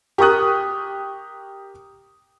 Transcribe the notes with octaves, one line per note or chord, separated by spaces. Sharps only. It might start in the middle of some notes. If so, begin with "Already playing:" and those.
G4 A#4 C#6 D#6 F#6